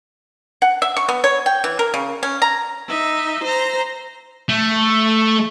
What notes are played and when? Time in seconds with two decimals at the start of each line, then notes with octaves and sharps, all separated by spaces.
0.62 F#5
0.82 E5
0.97 C#6
1.09 B3
1.24 C#5
1.46 G5
1.64 E3
1.79 A#4
1.94 C#3
2.23 C#4
2.42 A#5
2.88 D#4 E5
3.44 C5 A#5
4.49 A3